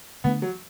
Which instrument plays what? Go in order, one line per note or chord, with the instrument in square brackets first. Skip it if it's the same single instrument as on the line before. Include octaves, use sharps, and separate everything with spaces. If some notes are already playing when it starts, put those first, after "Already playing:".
[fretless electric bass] D3 A3 D4 [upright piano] B3
[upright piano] F#3